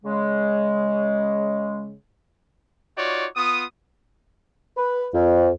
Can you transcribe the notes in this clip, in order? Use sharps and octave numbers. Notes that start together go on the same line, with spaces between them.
C#3 G#3
D#4 F4 F#4 C#5 D5
B3 F4 D#6
B4
F2